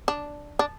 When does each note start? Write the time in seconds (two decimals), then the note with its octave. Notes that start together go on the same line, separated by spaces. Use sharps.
0.08 D4
0.59 D4